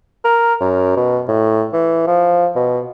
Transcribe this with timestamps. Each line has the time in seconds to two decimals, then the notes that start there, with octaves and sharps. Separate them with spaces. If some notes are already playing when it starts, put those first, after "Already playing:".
0.25 A#4
0.60 F#2
0.97 B2
1.28 A2
1.73 E3
2.07 F3
2.56 B2